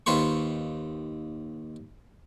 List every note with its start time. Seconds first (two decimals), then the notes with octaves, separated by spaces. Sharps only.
0.06 D#2 F4 B4 C5 C#6